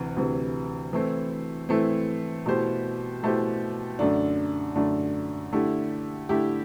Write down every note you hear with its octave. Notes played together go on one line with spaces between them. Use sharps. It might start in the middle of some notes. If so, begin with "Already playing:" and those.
Already playing: D2 C3 E3
D2 C3 E3
E3 A3 C4 E4
E3 A3 C4 E4
B2 A3 E4 G4 C5
B2 A3 E4 G4 C5
F#2 D3 A3 D4
F#2 D3 A3 D4
D3 A3 E4 G4
D3 A3 E4 G4